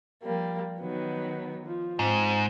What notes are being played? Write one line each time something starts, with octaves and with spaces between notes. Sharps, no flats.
F3 G3 A#3
D#3 F#3 B3
F3
G#2 C4